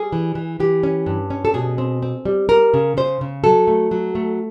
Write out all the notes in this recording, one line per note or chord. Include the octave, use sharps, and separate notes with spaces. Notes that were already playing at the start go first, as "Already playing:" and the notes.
Already playing: G3 G#4
E3
E3
E3 G4
C#4
G2
C#4
A4
B2 G#4
C4
C4
G3
G3 A#4
C#3
C#3 C5
C#3
F#3 A4
A3
F#3
A3